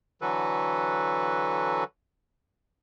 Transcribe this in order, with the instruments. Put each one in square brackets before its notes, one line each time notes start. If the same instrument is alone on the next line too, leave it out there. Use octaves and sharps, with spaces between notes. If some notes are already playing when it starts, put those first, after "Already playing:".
[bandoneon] D3 E3 F#3 F#4 A4 B4